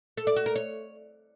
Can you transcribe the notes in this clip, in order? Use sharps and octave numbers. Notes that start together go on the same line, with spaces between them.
A4
D5
F#4
A#4
C#5